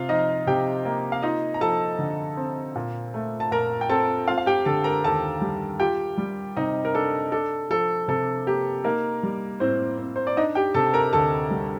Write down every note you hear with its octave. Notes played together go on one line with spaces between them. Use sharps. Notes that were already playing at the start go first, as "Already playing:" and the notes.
Already playing: C3 F4 F5
F3 D#4 D#5
C3 G4 G5
A#3
F5
D#4 F4 D#5
A#5
F3 A4 A5
D3
C4
A#2
A3
A5
A#2 A#4 A#5
G5
C4 A4 A5
C4 F4 F5
F5
G4 G5
D3 A4 A5
A#4 A#5
D#2 A4 A5
G3
F4 G4 G5
G3
C3 D#4 D#5
A#4
D4 A4
D4 A4
F3 A4
C3 A4
A#3 G4
A#3 D#4 A#4
G3
A2 C4 C5
C4
C5
D5
D4 D#4 D#5
G4 G5
C3 A4 A5
A#4 A#5
D2 A4 A5
G3